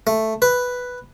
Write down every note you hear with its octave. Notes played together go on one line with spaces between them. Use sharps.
A3
B4